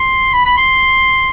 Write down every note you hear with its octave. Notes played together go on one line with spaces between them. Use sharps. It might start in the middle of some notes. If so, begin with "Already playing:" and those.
Already playing: C6
B5
B5
C6